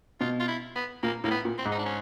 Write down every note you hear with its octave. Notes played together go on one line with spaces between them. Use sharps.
B2 F4
F4
E4
B3
A#2 A#3
A2 A#3
B3
A#2
C4
G#2
D#4
D4
C#4